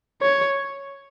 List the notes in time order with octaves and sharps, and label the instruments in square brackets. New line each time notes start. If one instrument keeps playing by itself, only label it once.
[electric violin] C#5